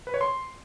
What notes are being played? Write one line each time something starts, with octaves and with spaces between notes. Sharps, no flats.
B4
C#5
C6